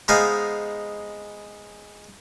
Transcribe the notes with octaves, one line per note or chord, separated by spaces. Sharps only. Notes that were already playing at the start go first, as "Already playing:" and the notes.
G#3 B3 D#4 C5 F5 G#5